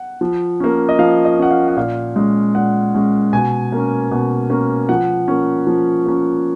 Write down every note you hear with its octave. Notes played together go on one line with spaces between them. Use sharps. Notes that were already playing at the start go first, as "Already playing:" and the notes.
Already playing: F#5
F3
A#3 C#4
D#5
F3 F5
D#5
A#3 C#4 F#5
F5
F#5
A#2 F5
G#3 C#4
A#2 F#5
G#3 C#4
B2 G#5
A#3 C#4
B2
A#3 C#4
F3 F#5
A#3 C#4
F3
A#3 C#4